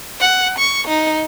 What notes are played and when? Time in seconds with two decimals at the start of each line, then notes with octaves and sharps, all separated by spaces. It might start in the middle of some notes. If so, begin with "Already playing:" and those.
0.20 F#5
0.59 C#6
0.87 D#4